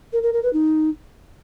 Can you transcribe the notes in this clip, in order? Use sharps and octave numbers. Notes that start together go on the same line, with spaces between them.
A#4
A#4
A#4
B4
D#4